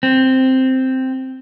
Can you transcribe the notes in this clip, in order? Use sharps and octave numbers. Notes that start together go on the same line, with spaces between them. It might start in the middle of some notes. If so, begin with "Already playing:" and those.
C4